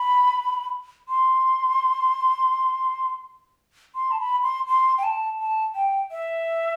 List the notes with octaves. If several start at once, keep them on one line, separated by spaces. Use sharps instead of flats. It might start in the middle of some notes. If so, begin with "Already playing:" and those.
Already playing: B5
C6
C6
A5
B5
C6
C6
G5
A5
A5
G5
E5